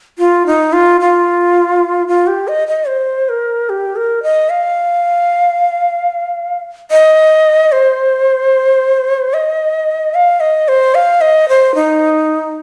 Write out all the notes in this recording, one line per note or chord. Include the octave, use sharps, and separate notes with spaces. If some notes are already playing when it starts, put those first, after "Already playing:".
F4
D#4
F4
F4
F4
G4
D#5
D#5
C5
A#4
G4
A#4
D#5
F5
D#5
C5
D#5
F5
D#5
C5
F5
D#5
C5
D#4